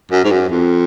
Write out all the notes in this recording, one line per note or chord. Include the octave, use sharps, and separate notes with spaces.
F#2
G#2
F#2
F2